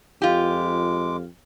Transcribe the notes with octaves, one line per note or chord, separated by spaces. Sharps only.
F2 G#3 F4 G4 D6